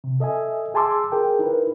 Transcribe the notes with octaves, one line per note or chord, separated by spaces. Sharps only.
C3
A4 D#5 E5 G#5
G#4 G#5 A5 C6 D6 E6
G#4 A#4 G5
D#4 E4 A#4 B4